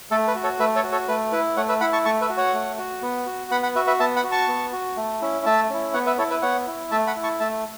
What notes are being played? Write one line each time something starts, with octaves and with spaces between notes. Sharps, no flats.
A3 A4
B4
F#4
A4 C#5
A3 B4 E5
A4 C#5
F#4
A4 C#5
A3 B4
E4 B4
A3 C#5 F#5
B4 E5
E4 F#5 B5
A5 C#6
A3 A5 C#6
B4 E5
F#4
C#5 F#5
A3
F#4
B3
F#4
B3 F#5 B5
F#5 B5
F#4 B4 E5
B4 E5
B3 E5 A5
F#5 B5
F#4
A5 C#6
B3
F#4
A3
C#4 E4
A3 E5 A5
C#4 E4
B3 C#5 F#5
B4 E5
E4 A4 C#5
B4 E5
B3 C#5 F#5
E4
A3 E5 A5
F#5 B5
E4
A5 C#6
A3 E5 A5